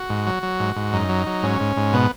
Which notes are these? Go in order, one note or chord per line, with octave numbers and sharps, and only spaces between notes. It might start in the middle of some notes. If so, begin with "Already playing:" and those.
Already playing: F#4
G#2
F#3
F#3
G#2
G#2
F#2 D#4
F#3
F#3
G#2 C#4
G#2
G#2
B2 B3